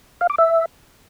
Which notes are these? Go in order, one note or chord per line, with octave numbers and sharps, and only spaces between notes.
F5
D6
E5